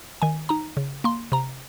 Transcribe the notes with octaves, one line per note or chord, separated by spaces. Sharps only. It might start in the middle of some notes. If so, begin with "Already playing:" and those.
D#3 G#5
D#4 A#5
C#3
A#3 C6
C3 A#5